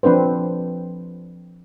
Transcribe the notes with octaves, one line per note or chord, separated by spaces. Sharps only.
F3 C4 D4 B4 C5